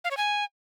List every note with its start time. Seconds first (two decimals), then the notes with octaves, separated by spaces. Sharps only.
0.04 F5
0.11 C#5
0.17 G#5